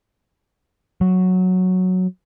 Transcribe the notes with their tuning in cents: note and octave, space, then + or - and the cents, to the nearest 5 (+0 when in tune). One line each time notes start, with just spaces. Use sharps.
F#3 -5